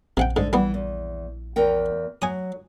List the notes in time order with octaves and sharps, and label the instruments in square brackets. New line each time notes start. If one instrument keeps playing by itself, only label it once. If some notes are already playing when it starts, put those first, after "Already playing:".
[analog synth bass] A#1 [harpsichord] C3 F#5 G5
[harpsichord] G#2 [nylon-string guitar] D3
[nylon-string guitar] E3 [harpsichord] G3 B3
[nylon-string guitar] E2
E2 A#4 G5
[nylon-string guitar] F#3 [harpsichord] G#5 D#6